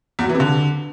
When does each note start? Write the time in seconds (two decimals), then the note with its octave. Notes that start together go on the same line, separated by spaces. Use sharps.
0.19 E2
0.24 F#3
0.29 E3
0.35 C3
0.40 D3